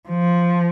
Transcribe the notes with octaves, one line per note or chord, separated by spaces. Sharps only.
F3